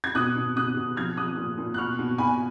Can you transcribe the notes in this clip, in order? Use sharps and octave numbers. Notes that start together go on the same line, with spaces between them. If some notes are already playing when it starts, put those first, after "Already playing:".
G#6
B2 D#6 F#6
B2
B2 D#6 F#6
B2
F3 F6 G#6
F3 D#6 F#6
A#2
A#2
F#6
B2 C#6 F6
B2
B2 G#5 B5